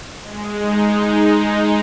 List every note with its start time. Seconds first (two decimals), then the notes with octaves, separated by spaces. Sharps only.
0.21 G#3
0.58 D#4
0.95 D#4